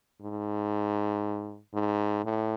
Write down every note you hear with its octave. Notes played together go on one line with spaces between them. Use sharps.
G#2
G#2
A2